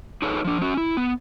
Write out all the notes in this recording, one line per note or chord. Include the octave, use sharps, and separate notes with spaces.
D#4 G#4 A4 B4 C#5
F3 D4
C#4 F#4
E4
B3